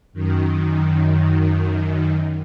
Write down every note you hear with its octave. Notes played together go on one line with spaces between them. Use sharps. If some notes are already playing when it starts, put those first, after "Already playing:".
F#2 D#3